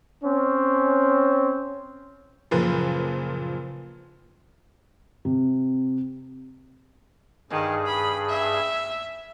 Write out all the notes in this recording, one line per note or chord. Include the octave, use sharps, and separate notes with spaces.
C4 C#4
F#1 A#2 F3 B4
C3
G2 D#3 G#4
B5
E5